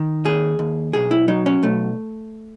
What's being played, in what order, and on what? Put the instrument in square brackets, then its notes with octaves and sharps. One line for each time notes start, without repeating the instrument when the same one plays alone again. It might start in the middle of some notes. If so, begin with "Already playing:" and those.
Already playing: [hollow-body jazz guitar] D#3
D#2 G#4
D#2
B1 G#4
E4
F#3 D#4
C#4
B1 A3